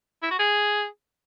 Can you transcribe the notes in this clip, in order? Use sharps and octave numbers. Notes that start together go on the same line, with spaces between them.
E4
F#4
G#4